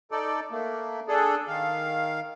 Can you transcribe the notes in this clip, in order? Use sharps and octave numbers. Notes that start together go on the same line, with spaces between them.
D#4 A4 D5
A3 A#3
D4 G#4 A4
D#3 F5